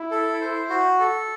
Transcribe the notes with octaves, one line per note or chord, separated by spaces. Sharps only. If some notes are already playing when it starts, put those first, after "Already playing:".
Already playing: E4
A4
C5
F#4
A4